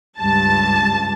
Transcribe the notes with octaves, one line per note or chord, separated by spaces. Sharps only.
C#2 G2 A5